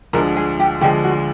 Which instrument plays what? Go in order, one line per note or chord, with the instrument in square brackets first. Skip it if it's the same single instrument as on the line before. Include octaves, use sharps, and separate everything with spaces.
[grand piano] D2 D3 F3 G#3 [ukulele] A#4
[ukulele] G#4
G4
[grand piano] D2 D3 F3 G#3 [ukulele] G4
[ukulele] F#4